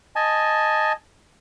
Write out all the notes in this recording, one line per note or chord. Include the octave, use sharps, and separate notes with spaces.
D#5 G#5 A5